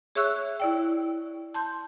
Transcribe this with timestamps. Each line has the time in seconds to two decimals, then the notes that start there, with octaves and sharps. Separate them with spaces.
0.15 G#4 C#5 E5 C#6 E6 F#6
0.60 E4 D5 G5
1.54 A5 C6 G6